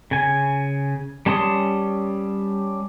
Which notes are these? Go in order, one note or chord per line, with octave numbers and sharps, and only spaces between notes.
C#3 G#5
G3 C#4 A5 C6 D#6